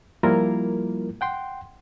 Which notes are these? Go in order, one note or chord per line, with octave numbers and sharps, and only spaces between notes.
F3 G3 A#3 E4 F4 A#4
F#5 G5 C6